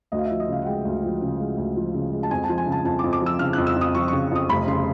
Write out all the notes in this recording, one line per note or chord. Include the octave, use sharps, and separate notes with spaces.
D2 D#5
F5
F3 E5
D#5
C#3 F5
F#5
G#3 G5
D2
F3
C#3
G#3
D2
F3
C#3
G#3
A5
F2 G#5
F3 A5
G#5
C#3
A5
F2 A5
D6
F2
D6
F3 E6
C#3 F6
F2 F#6
E6
F2 D#6
F3 C#6
C#3 C#6
F2 D#6
F1 B5
C#3 C6